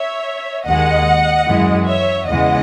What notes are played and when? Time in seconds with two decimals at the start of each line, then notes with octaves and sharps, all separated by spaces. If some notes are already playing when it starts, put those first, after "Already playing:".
Already playing: C#5 E5
0.66 D#2 D#3 G#3 D#5 F#5
1.47 F#2 E3 G#3
1.87 C#5 E5
2.27 E2 C#3 E3 G#3 D#5 F#5